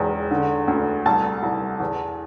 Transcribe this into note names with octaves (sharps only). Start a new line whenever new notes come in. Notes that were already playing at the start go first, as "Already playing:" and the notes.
Already playing: E1 E2
D3
D2
C2 A5
C2
E2